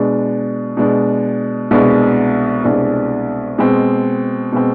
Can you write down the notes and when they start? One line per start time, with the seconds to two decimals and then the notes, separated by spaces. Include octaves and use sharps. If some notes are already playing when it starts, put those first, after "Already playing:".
Already playing: B2 G#3 D4
0.77 B2 G#3 D4
1.71 C2 B2 G#3 D4
2.64 C2 B2 G#3 D4
3.58 B2 G#3 C4
4.52 B2 G#3 C4